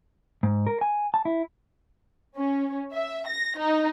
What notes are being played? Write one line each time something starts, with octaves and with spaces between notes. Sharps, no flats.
G#2
A#4
G#5
A5
E4
C#4
E5
A#6
D#4